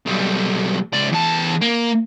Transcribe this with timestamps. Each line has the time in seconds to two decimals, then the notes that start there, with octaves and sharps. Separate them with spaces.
0.06 B1 G3
0.93 C#2 D5
1.11 E2 A5
1.61 A#3